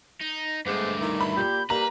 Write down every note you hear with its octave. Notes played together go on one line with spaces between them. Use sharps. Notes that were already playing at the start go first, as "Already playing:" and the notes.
D#4
G2 G#3 A3 B3 C5 D6
D#3 E3 E4
B5
A#2 G4 G6
G3 A#3 B4 A#5 F#7